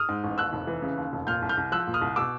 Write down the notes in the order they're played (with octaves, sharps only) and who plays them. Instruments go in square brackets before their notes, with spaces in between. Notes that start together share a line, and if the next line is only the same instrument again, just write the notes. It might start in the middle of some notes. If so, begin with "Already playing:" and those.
Already playing: [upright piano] D#6 F6
G#2
A1
D#2 E6 F#6
F1
E3
C#3
D#2
F1
A#2 F6 G6
C2
F6 G6
C2
F3 E6 F#6
A#2
D#6 F6
C2
B2 D6 E6